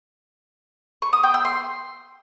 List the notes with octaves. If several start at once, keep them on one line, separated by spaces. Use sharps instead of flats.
C#6
D#6
G5
E6
C6